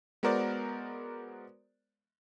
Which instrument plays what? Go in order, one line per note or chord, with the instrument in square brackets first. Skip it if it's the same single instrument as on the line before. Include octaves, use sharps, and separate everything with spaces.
[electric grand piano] G#3 B3 F#4 A#4 C5 D5